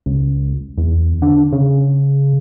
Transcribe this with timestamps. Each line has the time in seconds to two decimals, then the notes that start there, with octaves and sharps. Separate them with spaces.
0.06 C#2
0.78 E2
1.22 D3
1.53 C#3